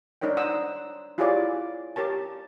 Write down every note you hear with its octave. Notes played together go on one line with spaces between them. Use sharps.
D4 D#4 A#4 C#5 G5
C5 F#5 D#6 E6
E4 F4 G4 G#4 C#5 D5
G4 A#4 C#5 A5